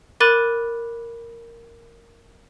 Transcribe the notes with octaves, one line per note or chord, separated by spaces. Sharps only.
A#4 B5 D6 F#6 A6 D#7